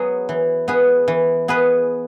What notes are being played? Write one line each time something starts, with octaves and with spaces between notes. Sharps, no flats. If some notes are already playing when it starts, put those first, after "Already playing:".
Already playing: F#3 B3 G#4
E3
B3 G#4 B4
E3
B3 G#4 B4